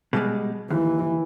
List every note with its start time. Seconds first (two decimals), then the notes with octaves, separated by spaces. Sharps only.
0.13 B2 G3 G#3
0.70 D#2 E3